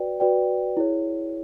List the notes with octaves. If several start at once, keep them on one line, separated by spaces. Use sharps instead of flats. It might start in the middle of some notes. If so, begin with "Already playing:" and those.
Already playing: F#4 B4 D5 G5
F#4 B4 D5 G5
E4 G#4 C#5